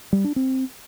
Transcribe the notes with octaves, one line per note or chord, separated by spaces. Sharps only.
G3
D4
C4